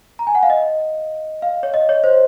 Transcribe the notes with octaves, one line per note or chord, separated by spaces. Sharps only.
A#5
G#5
F#5
F5
D#5
F5
C#5
D#5
C#5
C5